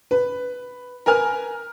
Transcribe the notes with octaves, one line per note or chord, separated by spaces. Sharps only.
B4
A#4 B4 G#5 F6